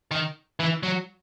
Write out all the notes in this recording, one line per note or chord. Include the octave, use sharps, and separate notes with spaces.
D#3
E3
F#3